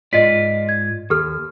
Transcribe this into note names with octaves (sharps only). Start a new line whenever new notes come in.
G#2 F4 D5 D#5 B6
G#6
D#2 G4 A4 F6